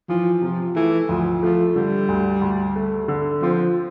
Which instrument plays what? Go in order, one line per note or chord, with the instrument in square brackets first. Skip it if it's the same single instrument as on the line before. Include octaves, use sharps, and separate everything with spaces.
[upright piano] E3 [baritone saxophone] F3
[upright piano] C3 [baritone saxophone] F3
[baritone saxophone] E3 [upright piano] A3
[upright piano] D2 [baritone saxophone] F3
[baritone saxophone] F3 [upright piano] A3
[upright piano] D3 [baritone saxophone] G3
[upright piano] D2
D2
A3
D3
[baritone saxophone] F3 [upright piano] C4